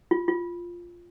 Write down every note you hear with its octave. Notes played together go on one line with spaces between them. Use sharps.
F4
F4